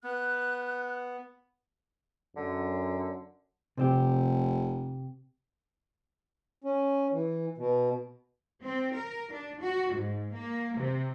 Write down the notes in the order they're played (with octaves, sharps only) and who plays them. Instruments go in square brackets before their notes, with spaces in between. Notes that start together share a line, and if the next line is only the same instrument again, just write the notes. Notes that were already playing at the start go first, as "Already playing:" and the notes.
[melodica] B3 [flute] F#6
[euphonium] F#2 [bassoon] D3
[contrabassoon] F1 [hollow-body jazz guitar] C3 C4 G4
[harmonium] C#4
E3
B2
[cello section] C4
A#4
D4
F#4
G#2
A#3
C3